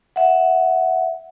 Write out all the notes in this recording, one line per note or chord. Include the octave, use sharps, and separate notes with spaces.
E5 F#5